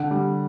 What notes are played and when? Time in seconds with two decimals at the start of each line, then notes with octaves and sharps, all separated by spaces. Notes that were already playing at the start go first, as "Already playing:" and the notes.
Already playing: D3 F#5
0.11 G3